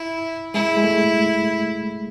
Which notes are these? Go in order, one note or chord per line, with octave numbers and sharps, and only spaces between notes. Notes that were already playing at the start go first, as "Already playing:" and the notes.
Already playing: E4
G#3 E4
G#3
A3